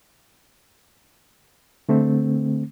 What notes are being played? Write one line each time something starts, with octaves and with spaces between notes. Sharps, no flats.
D3 A3 C4